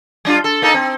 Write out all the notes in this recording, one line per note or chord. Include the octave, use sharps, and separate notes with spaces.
G3 D4 F4
A4
A#3 D#4 A4
C4